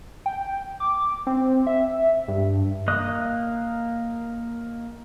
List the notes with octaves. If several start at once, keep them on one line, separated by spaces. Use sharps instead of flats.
G5
D6
C4
E5
G2
A#3 D#5 D#6 F#6